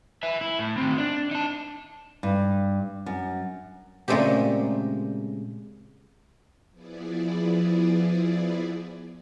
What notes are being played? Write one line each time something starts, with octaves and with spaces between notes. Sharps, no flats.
E5 G#5
E4
A2
D#3 C4
D4
D#4 A5
G2
F#2
A#2 C#3 G#3 A3 C4 G4
F3 B3 E4 G#4 D5